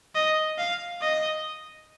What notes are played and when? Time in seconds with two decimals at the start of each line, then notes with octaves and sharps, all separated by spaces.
0.15 D#5
0.58 F5
1.01 D#5